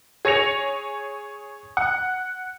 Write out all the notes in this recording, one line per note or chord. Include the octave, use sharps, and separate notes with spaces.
G#4 C#5 G#5 A#6 C#7 F7
F#5